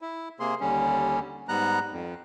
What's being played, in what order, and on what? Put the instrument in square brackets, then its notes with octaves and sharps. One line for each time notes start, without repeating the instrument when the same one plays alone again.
[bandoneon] E4
C3 A#3 G#4 C6
D#2 D3 G3 C#4
G#2 G3 B3 A#5 F#6
F2